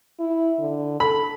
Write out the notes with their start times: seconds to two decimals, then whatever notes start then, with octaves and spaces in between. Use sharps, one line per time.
0.20 E4
0.59 D3
1.00 A4 B5